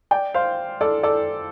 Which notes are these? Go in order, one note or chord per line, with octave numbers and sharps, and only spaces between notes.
D5 G5
C5 F5
A4 D5
A4 D5